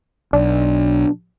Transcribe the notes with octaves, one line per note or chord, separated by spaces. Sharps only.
B1 D4